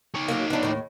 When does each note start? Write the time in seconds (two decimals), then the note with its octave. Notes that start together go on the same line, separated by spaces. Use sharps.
0.15 D#4 C#5
0.28 F#3 A#3
0.50 B3 D4
0.63 D#2 A2